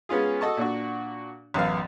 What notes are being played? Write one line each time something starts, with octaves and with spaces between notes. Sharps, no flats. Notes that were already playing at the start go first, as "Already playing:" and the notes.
G#3 B3 C#4 F4 G#4
F#4 A4 D#5 A5 C#6
A#2 D4 F#4
A1 F#2 B3 F5